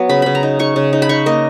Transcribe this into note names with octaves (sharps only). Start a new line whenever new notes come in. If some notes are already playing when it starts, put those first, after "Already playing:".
Already playing: F#3 B3
C#3 B5
C#3 B5
A#5
D#4
D#4 C#6
C#3
D#4
B5
D#4 C#6
A#3 D#5